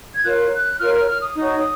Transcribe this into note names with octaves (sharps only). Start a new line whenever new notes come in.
G#6
F4 A#4 C#5 F#6
F#6
F4 A#4 C#5 F6
F6
F6
D#6
D#4 F#4 C#5